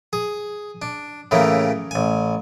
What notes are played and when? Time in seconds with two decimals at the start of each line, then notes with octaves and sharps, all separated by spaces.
0.13 G#4
0.82 D4
1.31 A2 C#3 E3 A#3
1.91 A1 G#5